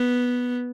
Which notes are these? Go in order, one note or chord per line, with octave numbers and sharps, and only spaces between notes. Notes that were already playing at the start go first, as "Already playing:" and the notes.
Already playing: B3